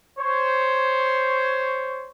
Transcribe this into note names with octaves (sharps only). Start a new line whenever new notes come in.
C5 C#5